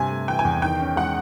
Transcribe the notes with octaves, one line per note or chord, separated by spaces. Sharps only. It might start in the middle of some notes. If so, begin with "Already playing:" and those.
Already playing: G2 C3 G#5
A3
E3 G5
G#5
E2
D#3 G5
C#4
G#3 F#5